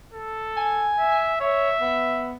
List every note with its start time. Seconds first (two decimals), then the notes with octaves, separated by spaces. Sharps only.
0.13 A4
0.57 G#5
0.98 E5
1.41 C#5 E5
1.81 B3